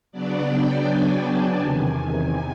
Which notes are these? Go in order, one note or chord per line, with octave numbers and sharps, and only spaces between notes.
C#3 F#3 B3 D4 D5
G5
G#5
A5
E2 C3 D#3 G#5
G#5